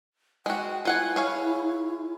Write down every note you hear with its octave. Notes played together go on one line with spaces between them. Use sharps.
G#3 F#4 G5
E4 F4 F#5 G#5
G#4 C#5 F5